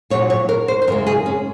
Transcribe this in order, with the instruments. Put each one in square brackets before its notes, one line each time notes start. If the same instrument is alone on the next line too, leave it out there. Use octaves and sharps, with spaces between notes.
[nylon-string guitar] A#2 F#3 C#5
C#5
A#4
C5
C5
F#2 C#3 G#3 A#4
G#4
C#4